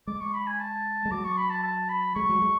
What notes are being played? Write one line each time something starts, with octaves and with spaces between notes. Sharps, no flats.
G#3 D6
C#6
B5
G#5
A5
G#3
F#3 D6
C#6
B5
A5
A5
B5
G#3 C#6
F#3
G#3